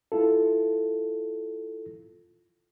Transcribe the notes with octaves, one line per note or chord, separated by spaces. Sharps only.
E4 F4 A4